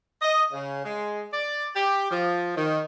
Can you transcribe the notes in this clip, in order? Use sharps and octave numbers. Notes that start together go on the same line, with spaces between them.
D#5
C#3
G#3
D5
G4
F3
D#3